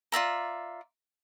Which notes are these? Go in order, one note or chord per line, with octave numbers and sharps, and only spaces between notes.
F4 D5 E5 A#5